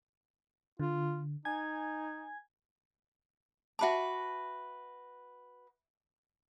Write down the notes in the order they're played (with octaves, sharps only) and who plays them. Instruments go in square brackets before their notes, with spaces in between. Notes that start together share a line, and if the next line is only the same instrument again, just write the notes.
[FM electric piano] D3 [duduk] F4
[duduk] D#4 [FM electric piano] G#5 G#6
[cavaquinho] F#4 B4 D6 [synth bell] E5 A5